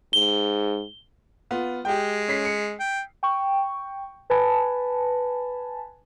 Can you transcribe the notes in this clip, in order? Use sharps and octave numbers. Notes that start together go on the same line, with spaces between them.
G#2 G7
B3 F4
G#3 G4 G5
C#4 B6 C7
C#7
G5
G5 C#6
B4 G#5 A5 B5